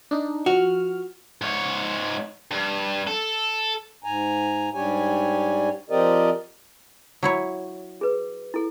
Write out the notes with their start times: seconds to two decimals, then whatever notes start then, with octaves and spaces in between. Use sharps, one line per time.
0.11 D4 D#4
0.46 F3 F#4 F6
1.41 G#2 C#5
2.51 G2
3.07 A4
4.04 G#2 G#5 A#5
4.74 G#2 G3 D4 G4 C#5 G#5
5.90 F3 C4 G4 A#4 D5 D#5
7.23 F#3 E4 C#5
8.01 G#4 B4
8.54 E4 A4